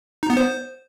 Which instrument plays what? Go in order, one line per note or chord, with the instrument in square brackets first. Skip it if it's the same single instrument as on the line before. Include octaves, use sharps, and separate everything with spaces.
[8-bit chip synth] D#4
B3
C5